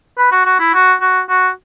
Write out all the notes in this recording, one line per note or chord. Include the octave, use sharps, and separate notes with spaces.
B4
F#4
F#4
E4
F#4
F#4
F#4